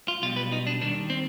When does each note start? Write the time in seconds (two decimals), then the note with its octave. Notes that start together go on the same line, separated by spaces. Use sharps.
0.08 F4
0.22 B1 B2 G3 F4
0.36 B4
0.52 D#4
0.67 D4
0.81 D#2 D#3 G3 D4
1.10 C4